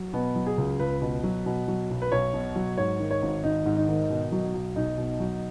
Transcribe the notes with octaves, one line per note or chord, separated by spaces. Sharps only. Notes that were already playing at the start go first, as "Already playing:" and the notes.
Already playing: F#3
B2 B3
F#3
G#4
C#2
C#2 B4
B2
F#3
B2
F#3
B1
B4
B1 C#5
B2
F#3
G#2 C#5
D#3
C#5
G#1
G#1 D#4
G#2
D#4
D#3
B2
F#3
B1
B1 D#4
B2
F#3